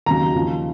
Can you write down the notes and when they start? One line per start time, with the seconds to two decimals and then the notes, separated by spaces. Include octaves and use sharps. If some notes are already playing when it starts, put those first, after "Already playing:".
0.06 D#2 C#3 F#3 A#5
0.35 D#2 C#3 F3